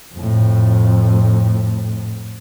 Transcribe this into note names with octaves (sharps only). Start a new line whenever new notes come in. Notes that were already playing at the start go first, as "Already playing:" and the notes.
F2 A2